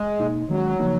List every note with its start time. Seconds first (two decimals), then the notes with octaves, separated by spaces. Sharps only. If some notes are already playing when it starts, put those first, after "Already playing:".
Already playing: G#3
0.20 B2 A#3 D#4
0.49 D#3 F#3 G#3 C#4
0.80 C#3 F3 A#3 D#4